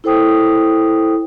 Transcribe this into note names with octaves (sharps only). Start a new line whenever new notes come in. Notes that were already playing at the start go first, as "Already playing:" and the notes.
E4 A4 C5 G5 D#6